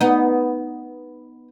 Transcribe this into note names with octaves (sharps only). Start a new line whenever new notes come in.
B3 D#4